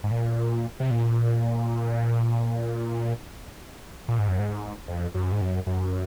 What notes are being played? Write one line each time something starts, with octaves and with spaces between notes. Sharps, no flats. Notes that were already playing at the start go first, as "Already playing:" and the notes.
G#2
A#2
C3
A#2
A#2
G#2
F#2
G#2
F2
F#2
G#2
F#2
F#2